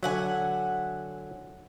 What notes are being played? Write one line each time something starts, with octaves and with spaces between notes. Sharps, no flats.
D3 F#3 E5 F#5 G#5